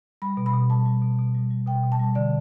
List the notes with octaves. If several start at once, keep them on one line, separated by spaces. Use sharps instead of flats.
G3 B5
B2
B5
B2
G3 A5
G3
B2
B2
G3
G3
B2 G5
B2
A5
G3
D3 D5